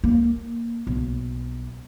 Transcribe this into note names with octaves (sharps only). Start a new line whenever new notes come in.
A#3
B1